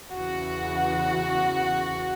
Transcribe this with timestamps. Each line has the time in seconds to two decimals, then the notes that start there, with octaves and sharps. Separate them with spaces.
0.13 E2 C#3 E3 F#4